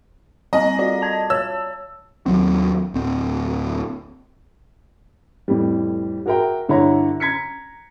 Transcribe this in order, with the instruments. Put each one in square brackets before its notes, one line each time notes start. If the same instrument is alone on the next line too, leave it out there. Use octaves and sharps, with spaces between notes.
[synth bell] G3 C4 A#5 [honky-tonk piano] D#5
[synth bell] F4 F#4 D5
A5 G#6
[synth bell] C#5 [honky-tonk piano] E6
[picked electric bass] D#2 F#3 C4
D1 C4
[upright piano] F2 A2 E3 G3
F#4 G#4 A#4 E5 G5
G2 D3 E4 C#5 A#5
A#5 G#6 B6 C#7